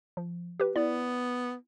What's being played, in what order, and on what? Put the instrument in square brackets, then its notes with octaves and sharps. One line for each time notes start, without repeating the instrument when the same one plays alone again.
[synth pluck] F3
G4 B4
[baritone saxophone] B3 [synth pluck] E4 D5